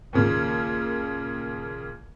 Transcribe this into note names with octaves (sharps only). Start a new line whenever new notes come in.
D#2 A#2 C#3